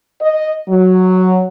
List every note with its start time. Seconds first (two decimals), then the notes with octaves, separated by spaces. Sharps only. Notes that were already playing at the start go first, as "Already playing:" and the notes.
0.21 D#5
0.69 F#3